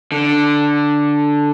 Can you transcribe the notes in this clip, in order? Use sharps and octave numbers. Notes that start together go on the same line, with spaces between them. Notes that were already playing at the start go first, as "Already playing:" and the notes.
D3